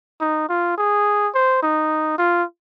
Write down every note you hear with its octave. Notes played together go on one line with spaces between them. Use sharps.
D#4
F4
G#4
C5
D#4
F4